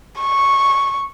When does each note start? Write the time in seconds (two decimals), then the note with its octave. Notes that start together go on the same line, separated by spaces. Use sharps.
0.20 C#6